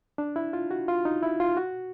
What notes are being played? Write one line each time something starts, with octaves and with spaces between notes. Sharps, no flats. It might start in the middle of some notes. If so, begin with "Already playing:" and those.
D4
E4
F4
F#4
F4
D#4
E4
F4
F#4